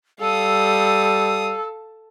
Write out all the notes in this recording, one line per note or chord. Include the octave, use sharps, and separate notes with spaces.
G3 A4 F5 D#6 E6